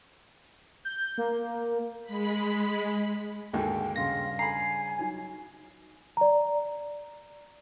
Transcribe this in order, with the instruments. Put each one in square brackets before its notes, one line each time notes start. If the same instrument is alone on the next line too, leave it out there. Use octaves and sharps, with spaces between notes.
[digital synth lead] G6
A#3
[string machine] G#3 B5
[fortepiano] D#2 G#2 D3 [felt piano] F#4 G#4 G#5 [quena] G5
[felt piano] G2 C#3 C6 [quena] F5 [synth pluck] A#6
[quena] G#5 [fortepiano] A#5 B5 [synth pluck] C7
[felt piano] F#3 D#4 F#4
[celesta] D5 A#5